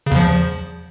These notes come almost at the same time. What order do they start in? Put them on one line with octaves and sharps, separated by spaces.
C#3 E2 F3